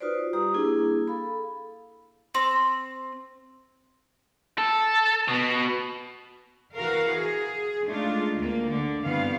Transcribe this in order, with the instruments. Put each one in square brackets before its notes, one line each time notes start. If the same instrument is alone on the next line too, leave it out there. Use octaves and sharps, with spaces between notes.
[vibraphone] D#4 F4 F#4 B4 C5 D5
G3 G4 A#5 D#6
A#3 D4 E4 G#4
A4 F5 B5
[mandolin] C4
[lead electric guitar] A4
B2
[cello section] E3 F#4 A#4 F5
G#4
G#3 A3 D4 D#4 F4
D2 A#3
D3
G2 E3 B3 C4 F5